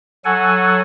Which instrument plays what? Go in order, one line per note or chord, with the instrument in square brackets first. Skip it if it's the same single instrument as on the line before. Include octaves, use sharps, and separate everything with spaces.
[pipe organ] F#3 A4 F#5 G#5